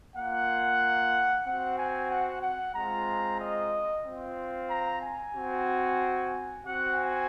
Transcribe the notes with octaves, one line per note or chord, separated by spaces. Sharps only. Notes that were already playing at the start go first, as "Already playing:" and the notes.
A#3 F4 F#5
C4 F#4 F#5
G#5
F#5
F#5
G#3 C4 F4 A#5
D#5
C4 F4
A#5
G#5
C4 F#4
C4 F#4 F#5
G#5